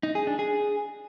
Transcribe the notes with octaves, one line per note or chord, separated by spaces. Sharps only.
D#4
G#4
D4
G#4